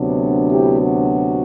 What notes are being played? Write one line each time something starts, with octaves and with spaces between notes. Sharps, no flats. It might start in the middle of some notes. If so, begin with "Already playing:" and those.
Already playing: D2 C3 F#3 B3 D4
E4 G4
F#4